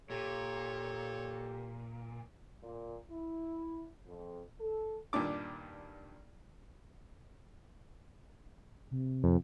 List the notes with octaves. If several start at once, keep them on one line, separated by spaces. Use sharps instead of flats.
A#2 G4 A4 C#5
A#2
E4
F2
A4
G2 A#2 D#3 D4 D6
C3
F2